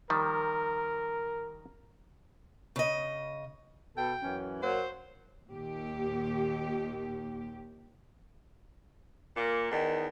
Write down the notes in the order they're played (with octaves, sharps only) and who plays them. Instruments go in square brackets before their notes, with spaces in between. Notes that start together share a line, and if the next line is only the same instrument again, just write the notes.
[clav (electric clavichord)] D#3 F3 G3 [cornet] A#4
[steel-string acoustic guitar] C#3 D#5
[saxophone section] B2 A4 [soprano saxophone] G5
[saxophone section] F#2 E3 C#4
[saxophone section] F#2 F#3 A#3 [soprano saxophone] C5
[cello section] D#2 A#2 G4
[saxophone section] A#2 A#3
E2 D#3